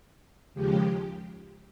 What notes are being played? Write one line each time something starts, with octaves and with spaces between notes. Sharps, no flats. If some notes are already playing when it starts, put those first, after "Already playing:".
D#2 C#3 F3 G#3 G4